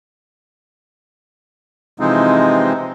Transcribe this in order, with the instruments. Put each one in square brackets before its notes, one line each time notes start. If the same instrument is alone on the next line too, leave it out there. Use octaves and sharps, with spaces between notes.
[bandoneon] C3 E3 F3 G#3 C4 D#4